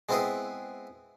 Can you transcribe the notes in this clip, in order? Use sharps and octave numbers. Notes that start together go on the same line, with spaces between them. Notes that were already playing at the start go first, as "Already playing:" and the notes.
G#3 B3 C4 E4 G#4 B4